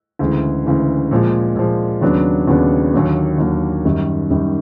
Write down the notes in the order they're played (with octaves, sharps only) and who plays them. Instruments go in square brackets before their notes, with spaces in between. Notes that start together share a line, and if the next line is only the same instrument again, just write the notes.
[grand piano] D2 C#3 E3 G#3
D2 C#3 E3 G#3
A#2 F3 G#3
A#2 F3 G#3
D#2 C#3 F#3 B3 D4
D#2 C#3 F#3 B3 D4
D#2 D3 F#3 A#3
D#2 D3 F#3 A#3
F#2 D#3 G3
F#2 D#3 G3